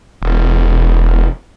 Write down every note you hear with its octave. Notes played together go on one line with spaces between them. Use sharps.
E1